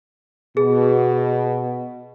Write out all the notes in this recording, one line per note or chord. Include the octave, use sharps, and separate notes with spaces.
B2 G#4